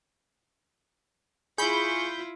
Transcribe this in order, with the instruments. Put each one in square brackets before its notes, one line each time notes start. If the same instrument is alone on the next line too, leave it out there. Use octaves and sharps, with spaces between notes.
[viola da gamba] E4 F4 [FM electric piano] G#4 [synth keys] B5 G6 [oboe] C#6